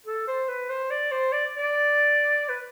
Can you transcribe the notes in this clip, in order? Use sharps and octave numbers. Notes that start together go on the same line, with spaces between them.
A4
C5
B4
C5
D5
C5
D5
D5
B4